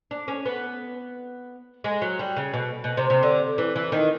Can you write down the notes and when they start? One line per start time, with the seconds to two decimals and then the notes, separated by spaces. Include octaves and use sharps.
0.11 D4
0.28 C#4
0.45 B3
1.84 G#3
2.02 F#3
2.19 G3
2.36 C#3
2.54 B2
2.84 B2
2.97 C3
3.10 C3
3.23 D3
3.58 E3
3.76 E3
3.92 D#3